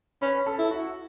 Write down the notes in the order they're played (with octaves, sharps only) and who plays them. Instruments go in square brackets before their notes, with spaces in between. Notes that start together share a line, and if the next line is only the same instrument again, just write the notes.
[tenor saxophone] C#4 [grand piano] B4 B5
[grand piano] A4 A5
[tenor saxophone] E4
[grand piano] F#4 F#5